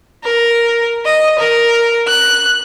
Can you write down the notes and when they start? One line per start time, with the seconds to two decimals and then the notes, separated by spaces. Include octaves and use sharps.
0.24 A#4
1.06 D#5
1.39 A#4
2.08 F#6